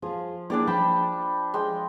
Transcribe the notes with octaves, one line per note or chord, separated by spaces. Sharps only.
F3 F4 G#4
A#3 D4 E4 G#4 D5 G5
F3 G5 A5 B5
G#3 G5